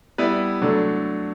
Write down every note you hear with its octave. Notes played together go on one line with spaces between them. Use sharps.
G3 B3 E4 B4
D3 F#3 A3 D4